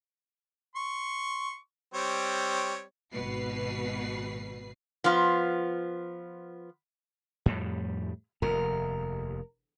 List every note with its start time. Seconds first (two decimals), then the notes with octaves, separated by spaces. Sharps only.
0.76 C6 C#6
1.94 G3 C4 C#5
3.13 G#1 B2 B4 C7
5.04 F3 B3 F4
7.46 F2 A2 G3
8.42 F1 D#2 A#4